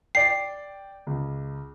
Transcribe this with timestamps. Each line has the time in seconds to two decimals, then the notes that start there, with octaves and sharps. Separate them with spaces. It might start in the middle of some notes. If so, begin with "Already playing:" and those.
0.15 D5 G5 C7
1.07 C#2